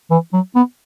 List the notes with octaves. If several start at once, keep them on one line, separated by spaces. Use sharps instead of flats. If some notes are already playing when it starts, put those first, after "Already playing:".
E3
F#3
B3